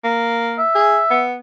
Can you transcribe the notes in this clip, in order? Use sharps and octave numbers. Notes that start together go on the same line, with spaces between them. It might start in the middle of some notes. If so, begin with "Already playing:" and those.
A#3
E5
G#4
B3